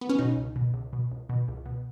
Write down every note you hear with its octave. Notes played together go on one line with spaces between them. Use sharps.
B3
C#4
B2 D#4
C#2
B2
C#2
B2
C#2
B2
C#2
B2